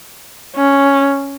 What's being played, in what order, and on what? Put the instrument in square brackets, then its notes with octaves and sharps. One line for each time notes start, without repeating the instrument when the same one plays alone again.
[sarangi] C#4